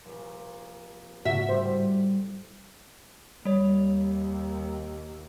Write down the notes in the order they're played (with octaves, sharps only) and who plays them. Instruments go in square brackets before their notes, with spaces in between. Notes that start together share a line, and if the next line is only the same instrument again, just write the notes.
[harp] F1 A#1
[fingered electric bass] G#2 C#3 A3 [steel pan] F#4 [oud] E5
[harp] A2 G3 [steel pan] C5
[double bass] D#2 [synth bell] G3 C#5